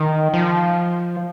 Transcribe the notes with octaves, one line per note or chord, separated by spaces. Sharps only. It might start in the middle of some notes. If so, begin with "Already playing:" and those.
Already playing: D#3
F3